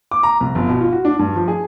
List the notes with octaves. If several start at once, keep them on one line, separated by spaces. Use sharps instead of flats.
D6
A#5
C2
G1
B2
F4
F#4
D4
G2
F3
G#4